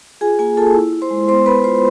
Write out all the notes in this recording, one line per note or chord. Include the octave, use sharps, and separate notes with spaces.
F4 G#4 G#5
A#3 G#4 G#5
F4 A4 A5
E4
E4
C5 C6
G#3
B3 C5 C6
B3 B4 B5
F4 C5 C6